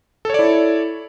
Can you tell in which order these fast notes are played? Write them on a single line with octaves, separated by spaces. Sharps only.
A4 C#5 D5 E4